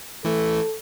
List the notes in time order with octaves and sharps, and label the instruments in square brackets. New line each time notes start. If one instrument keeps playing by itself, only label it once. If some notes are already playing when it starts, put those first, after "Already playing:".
[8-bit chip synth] E3 A3 [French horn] A4